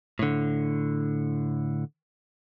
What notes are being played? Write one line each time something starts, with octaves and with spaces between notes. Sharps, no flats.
A2 D3